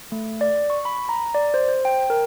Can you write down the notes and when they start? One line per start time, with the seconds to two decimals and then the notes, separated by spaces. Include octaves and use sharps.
0.12 A3
0.41 D5
0.70 C#6
0.85 B5
1.09 A#5
1.35 D5
1.54 C5
1.69 C5
1.85 G5
2.10 A#4